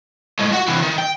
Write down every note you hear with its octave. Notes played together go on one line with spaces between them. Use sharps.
A2 G#3
F#4 F#5
C3 E3
D#3
G5